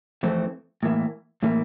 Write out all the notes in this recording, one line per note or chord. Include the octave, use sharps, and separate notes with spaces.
F2 E3 A3 C4
A2 E3 A#3 E4
A2 E3 A#3 E4